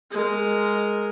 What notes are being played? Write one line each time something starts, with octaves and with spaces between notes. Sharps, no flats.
G#3 A#4